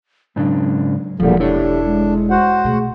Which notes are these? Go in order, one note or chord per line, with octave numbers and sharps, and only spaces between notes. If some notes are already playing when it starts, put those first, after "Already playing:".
G#2 C#3 F#3 D4
E1 E2 A#2 D3 F3 G3
D4 E4 G4 A4 C#5
G#3
F#4 C5 F#5
B2 A3 G#4